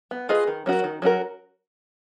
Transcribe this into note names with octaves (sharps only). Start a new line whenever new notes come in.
B3
F4 G#4 B4 D#5
D#3
F#3 C#4 F#4 A#4
D#3
F#3 C#4 F#4 A#4